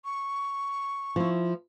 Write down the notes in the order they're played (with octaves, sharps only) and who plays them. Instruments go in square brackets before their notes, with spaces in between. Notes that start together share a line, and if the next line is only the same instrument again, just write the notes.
[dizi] C#6
[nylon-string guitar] F3 E4